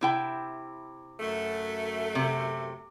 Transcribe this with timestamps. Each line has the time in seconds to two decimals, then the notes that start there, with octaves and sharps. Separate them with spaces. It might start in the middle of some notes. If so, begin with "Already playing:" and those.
0.01 C3 E4 G5
1.20 F#2 A3
2.15 C3